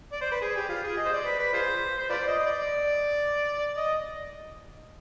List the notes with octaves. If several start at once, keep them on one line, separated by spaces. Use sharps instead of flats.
D5
C5
B4
G#4
G4
F4
G#4
D#5
C5
D5
B4
B4
F4 G#4 C5
C5
F4 B4 D5
D#5
D#5
D5
D#5